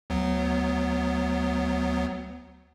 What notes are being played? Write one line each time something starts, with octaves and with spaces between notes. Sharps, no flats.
D2 F#3 B3